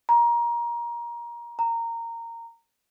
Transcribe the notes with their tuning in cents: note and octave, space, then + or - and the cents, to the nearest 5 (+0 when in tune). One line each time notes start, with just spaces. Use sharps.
A#5 +20
A#5 -15